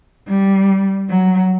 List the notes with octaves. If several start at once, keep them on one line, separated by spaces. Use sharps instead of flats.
G3
F#3